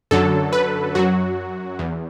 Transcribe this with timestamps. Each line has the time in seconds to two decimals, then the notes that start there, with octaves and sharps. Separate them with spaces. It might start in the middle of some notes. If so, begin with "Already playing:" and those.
0.11 F#2 D3 F#3 A4
0.53 B4
0.95 F#2 F#3 F#4
1.79 E2